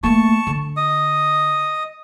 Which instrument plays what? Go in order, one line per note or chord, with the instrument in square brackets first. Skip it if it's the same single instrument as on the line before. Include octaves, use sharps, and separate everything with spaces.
[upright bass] A3 A#3 [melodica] A5 C#6
[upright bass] D3
[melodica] D#5 D#6